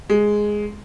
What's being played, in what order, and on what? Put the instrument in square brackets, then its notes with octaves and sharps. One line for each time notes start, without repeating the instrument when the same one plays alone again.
[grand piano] G#3